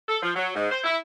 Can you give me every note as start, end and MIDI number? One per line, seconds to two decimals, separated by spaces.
0.08 0.17 69
0.23 0.31 53
0.36 0.50 54
0.55 0.70 44
0.72 0.79 72
0.84 0.97 64